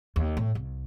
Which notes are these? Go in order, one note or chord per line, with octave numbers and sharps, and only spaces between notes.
D#2
A2
C2